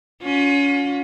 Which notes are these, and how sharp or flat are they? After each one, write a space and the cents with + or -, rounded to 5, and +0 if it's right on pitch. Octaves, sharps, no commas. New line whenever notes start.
C#4 +25 F4 +45